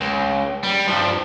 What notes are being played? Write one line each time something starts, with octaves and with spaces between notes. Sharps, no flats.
C#2
G3
G2 F3